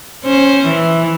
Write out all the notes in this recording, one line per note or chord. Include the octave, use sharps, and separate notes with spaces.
C#4 C5
E3